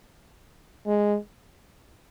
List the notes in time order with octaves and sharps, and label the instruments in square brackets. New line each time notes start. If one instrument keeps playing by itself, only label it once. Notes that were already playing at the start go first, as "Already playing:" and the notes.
[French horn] G#3